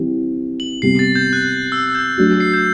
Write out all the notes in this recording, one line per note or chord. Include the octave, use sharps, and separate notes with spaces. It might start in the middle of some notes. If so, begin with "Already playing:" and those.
Already playing: E3 G3 C4
F#7
C3 G3 B3 C7
A6
G6
F#6
E6
G6
F#3 A3 D4 F#4
C7
G6